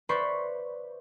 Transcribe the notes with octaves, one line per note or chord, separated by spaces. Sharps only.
B4 C5 D5 E5 B5 C#6